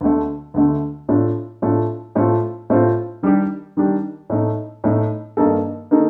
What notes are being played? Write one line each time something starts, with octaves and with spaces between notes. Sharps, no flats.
D2 D3 A3
D2 D3 A3
A2 A3 D4 F4
A2 A3 D4 F4
A2 A3 C4 F4
A2 A3 C4 F4
D#3 G3 D4 G4
D#3 G3 D4 G4
A2 A3 D#4
A2 A3 D#4
G2 D#3 A#3 D#4 A4
D#3 A#3 D#4 A4